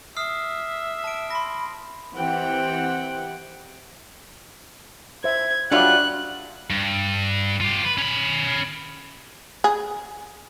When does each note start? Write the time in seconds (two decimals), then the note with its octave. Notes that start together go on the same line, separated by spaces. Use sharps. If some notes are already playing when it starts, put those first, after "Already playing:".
0.17 E5 D#6 F6 C7
1.04 A5 D7
1.31 B5 C6 A#6
2.14 E3 C4 G4 F#5 G5
5.24 C5 E5 G#6
5.71 F#3 G3 D4 F4 E5 F#5 D6 F#6
6.70 G2
7.61 F4 G4
7.85 B4
7.98 C#4 B5
9.64 G#4